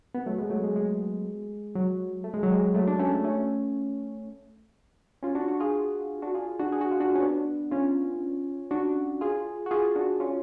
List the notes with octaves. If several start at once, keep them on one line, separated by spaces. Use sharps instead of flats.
B3
F#3 A3
G#3 B3
F#3 A3
G#3
G#3
F#3
A3
G#3
F#3
G#3
F#3 A3
D4
A3 C#4
A3 C#4
C#4 F4
D4 F#4
D4 F#4
F4 G#4
D4 F#4
F4 G#4
D4 F#4
G#4
F#4
F4
D4 F#4
C#4
B3 D4
C#4 F4
D4 F#4
F4 G#4
F#4
F4 G#4
D4 F#4
C#4 F4